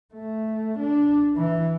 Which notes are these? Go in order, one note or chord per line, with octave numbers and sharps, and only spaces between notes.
A3
D4
E3